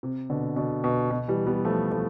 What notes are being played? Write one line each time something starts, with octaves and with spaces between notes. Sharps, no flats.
C3
B2 D3
B2 D3
B2
B2
E3 G3
G3 B3
F3 A3
F3 A3